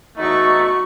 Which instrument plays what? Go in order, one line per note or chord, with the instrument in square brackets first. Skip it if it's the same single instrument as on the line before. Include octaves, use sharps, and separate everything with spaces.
[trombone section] E2 D#4 [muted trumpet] A3 [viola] F#4 C#6